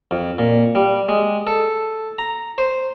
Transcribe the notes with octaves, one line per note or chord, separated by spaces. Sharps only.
F2
A#2
G3
G#3
A4
A#5
C5